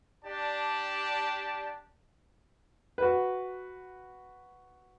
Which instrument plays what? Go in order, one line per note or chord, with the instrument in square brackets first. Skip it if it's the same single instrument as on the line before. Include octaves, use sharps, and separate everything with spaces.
[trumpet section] D4 G4 D5 A5
[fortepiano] F#4 B4